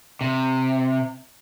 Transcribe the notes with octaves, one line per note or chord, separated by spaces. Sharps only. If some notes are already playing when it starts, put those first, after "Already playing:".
C3